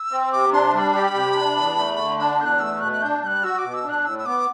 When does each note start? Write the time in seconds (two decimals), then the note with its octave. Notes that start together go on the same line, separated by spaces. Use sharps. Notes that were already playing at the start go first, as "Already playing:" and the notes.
Already playing: E6
0.12 C4
0.32 C3 D6
0.52 D4 C6
0.74 G3 C6
0.79 B5
0.94 G4
1.15 C3
1.36 D4
1.57 E2
1.77 A3
1.98 D3
2.19 D4 B5
2.39 E2 G6
2.45 F#6
2.60 A3 E6
2.80 B2 F#6
2.92 F#6
3.02 D4 G6
3.22 G3 G6
3.26 F#6
3.43 F#4 E6
3.58 D6
3.63 B2
3.74 E6
3.84 D4
3.89 F#6
4.05 A2 E6
4.19 E6
4.26 B3 D6